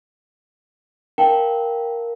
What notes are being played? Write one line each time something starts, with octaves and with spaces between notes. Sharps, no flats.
A#4 F5 G5 A5